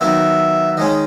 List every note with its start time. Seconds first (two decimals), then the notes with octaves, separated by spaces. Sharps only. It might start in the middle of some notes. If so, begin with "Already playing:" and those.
0.01 D#3 F#3 B3 D#4 E5
0.77 D#3 G#3 C#4 D#5